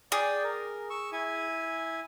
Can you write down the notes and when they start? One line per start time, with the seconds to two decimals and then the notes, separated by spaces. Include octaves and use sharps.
0.12 G#4 D5 G5
0.44 A#4
0.90 C#6 E6
1.12 E4 G#5